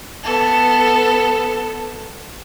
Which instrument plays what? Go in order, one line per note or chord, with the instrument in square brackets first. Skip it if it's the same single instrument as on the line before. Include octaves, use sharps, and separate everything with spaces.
[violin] B3 A4